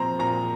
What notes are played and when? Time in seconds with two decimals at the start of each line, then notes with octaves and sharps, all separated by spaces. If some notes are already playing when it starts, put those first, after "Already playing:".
Already playing: A#2 F3 C4 A#5 C6
0.19 A#2 A#5